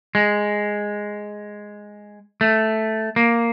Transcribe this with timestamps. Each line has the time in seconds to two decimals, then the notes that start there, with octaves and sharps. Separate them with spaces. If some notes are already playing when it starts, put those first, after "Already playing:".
0.15 G#3
2.41 A3
3.16 A#3